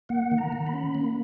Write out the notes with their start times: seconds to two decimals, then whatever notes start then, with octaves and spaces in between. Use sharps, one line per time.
0.09 A#3 F#5
0.31 D#3
0.38 A#5
0.52 D#3
0.66 B5
0.73 C#4
0.95 A#3